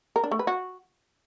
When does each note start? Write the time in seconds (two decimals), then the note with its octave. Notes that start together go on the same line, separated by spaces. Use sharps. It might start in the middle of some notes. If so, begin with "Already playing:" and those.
0.16 A#4
0.24 D4
0.31 A3
0.39 B4
0.47 F#4